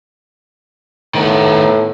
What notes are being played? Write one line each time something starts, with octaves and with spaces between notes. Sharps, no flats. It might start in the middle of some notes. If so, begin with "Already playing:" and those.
A2 D#3 B3